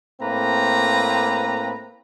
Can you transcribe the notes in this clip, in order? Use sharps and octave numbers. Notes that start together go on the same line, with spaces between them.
A2 A#3 C4 B4 A#5